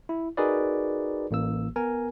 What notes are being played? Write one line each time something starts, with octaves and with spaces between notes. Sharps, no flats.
E4
D#4 F#4 G#4 A#4 B4 D5
A1 A#3 E6
B3 A#4 G#5